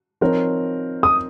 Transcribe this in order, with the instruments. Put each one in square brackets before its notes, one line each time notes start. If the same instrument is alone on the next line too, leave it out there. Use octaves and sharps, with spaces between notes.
[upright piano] F3 C4 D#4 A#4 C#5
[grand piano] D#6